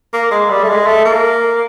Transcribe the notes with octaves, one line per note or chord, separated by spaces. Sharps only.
A#3
G#3
G3
A3
G#3
A3
A#3